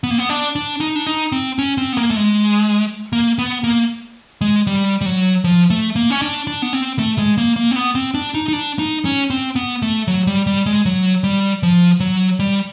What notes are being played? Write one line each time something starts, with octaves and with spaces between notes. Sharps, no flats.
B3
A#3
B3
D4
D4
D#4
D4
D#4
C4
C#4
C4
B3
A#3
A3
G#3
A#3
B3
A#3
G#3
G3
G3
F#3
F3
A3
A#3
C#4
D4
D4
B3
C4
A3
G#3
A#3
A#3
C4
B3
C4
D4
D#4
D#4
D4
D#4
C#4
C4
B3
A3
F#3
G3
G3
G#3
F#3
G3
F3
F#3
G3